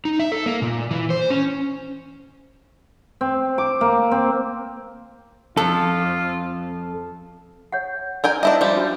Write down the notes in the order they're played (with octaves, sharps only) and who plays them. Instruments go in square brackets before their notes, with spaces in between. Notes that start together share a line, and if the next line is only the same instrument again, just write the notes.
[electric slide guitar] D#4
E5
A4
A#3
A#2
E3
C5
C#4
[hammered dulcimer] C4
D6
A#3
C4
[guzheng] F2 [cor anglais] F4 [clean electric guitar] A4
[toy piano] C#5 F#5
[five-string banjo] A#4 G5 G#5
[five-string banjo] D4 E4 D#5 [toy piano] E5 A5
[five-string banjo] F3 G3
[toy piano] D4 F#4 C5